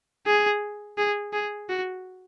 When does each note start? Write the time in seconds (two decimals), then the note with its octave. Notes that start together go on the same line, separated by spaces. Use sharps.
0.26 G#4
0.98 G#4
1.33 G#4
1.69 F#4